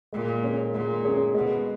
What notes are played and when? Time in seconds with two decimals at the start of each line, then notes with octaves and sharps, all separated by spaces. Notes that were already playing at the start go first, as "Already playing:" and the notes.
0.13 A#2 G#3
0.43 C#4 G#4 C#5
0.73 A#2 G#3
1.04 C#4 G#4 C#5
1.34 B2 G#3